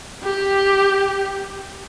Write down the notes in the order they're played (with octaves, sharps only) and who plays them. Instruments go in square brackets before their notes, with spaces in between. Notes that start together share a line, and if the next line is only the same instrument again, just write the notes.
[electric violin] G4